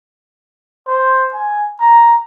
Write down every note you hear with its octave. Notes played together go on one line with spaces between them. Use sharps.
C5
G#5
A#5